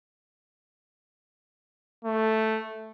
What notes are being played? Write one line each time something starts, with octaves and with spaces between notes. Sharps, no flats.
A3